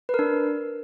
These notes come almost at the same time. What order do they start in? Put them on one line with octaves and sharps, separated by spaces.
B4 A#4 D4